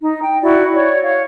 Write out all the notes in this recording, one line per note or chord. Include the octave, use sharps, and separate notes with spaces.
D#4
G5
E4 F#4 D5
C#5 D5
C#5 F5